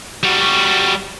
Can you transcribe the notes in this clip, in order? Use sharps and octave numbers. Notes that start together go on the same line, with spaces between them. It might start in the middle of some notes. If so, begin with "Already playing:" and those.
G3 F#4